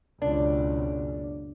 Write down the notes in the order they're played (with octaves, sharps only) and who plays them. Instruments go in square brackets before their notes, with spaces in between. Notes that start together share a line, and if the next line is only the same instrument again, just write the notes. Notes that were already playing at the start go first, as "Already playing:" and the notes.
[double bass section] F#1 C#2 B2 [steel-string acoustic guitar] D4